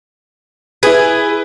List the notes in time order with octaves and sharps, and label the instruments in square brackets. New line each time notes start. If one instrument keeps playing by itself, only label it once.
[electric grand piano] E4 B4 [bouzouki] G#4